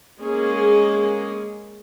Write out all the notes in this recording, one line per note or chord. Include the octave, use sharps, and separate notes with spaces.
G#3 A#3 C#4 G#4